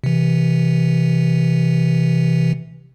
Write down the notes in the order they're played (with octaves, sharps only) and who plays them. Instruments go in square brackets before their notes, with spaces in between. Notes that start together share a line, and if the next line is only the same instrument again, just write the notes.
[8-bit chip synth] C3 E3